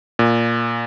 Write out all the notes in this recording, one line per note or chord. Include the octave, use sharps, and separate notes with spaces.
A#2